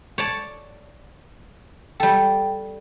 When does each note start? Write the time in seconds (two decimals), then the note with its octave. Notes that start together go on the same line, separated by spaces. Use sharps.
0.18 C#5 D5 A5
2.00 G3 A4 G5